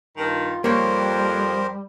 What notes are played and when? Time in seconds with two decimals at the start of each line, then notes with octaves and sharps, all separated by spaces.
0.17 G2 D#3 F4
0.64 F2 G3 A#3 G4 A#4 C5 C#5